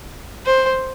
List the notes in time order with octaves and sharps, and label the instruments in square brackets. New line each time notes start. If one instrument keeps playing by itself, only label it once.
[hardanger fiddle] C5